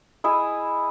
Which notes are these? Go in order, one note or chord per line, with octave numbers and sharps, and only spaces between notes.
E4 G#4 D#5